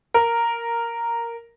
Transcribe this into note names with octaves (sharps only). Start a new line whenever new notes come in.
A#4